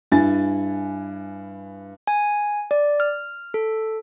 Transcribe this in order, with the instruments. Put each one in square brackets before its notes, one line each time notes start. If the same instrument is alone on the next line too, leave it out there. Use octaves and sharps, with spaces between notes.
[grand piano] G2 E4 G#5 A6
[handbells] G#5
D5
F6
A4